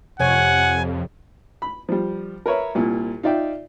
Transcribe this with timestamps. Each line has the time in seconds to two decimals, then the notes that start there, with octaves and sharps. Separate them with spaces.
0.20 F2 C3 C#5 F#5 G#5
1.62 B5
1.89 F3 G3
2.46 A#4 B4 C#5 E5
2.75 C2 A#2
3.23 D#4 F4 D5 E5 G5